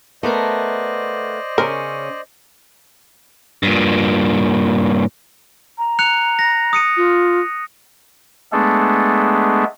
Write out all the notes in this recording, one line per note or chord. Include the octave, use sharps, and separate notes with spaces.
A3 B3 A#4 C5 D5 D#5
C#3 C#4 A#4
G2 A#2
A#5
F#6 C#7 F7
A#6
D#6 C#7 D#7
F4
G#3 A3 B3 D4 G#4 A4